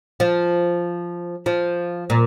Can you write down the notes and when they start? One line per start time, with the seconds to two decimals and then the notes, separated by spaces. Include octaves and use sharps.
0.20 F3
1.46 F3
2.10 A#2